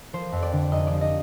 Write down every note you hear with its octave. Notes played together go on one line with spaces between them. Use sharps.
F3 C5
F2
D5
D3
F1 D#5
F3 D5
D#5